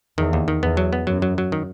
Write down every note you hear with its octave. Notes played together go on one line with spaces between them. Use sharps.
E2 D#3
D#2
D#3
E2 B3
F#3
B3
F#2 F#3
F#3
F#3
D#3